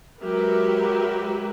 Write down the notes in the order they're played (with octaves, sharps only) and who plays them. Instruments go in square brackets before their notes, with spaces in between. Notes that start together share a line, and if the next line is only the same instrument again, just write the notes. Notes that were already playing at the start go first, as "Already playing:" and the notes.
[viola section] F#3 G#3 G4 A#4 B4 E5